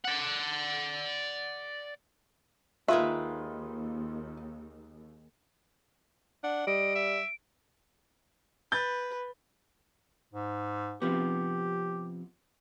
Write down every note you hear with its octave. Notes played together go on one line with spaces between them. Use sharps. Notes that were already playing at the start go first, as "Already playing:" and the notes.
D5 F#5
D#2 D#3 G#3 F4 B4 E5
D4 F#5
G3 D#5 D7
E5
B4 G6 A6
G#2
C3 F3 B3 G4